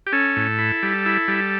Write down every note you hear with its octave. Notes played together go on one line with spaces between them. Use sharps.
G4
C#4 A4
A2
E4
G3
E4
G3